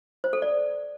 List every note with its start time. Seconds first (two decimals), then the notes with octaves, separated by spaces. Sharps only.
0.24 C5
0.33 A4
0.42 D5